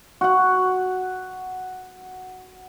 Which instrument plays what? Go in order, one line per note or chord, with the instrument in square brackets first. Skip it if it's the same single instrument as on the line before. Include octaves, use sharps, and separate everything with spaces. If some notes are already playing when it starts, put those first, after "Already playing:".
[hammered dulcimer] F#4 F#5